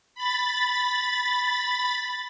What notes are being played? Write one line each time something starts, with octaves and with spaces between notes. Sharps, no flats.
B5 A6